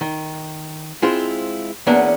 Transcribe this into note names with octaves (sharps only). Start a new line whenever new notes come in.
D#3
G#3 C4 E4 F4 C5
E2 A#3 B3 C#4 D4